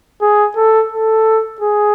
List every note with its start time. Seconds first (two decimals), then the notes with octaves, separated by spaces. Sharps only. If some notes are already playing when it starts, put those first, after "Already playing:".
0.22 G#4
0.56 A4
0.92 A4
1.61 G#4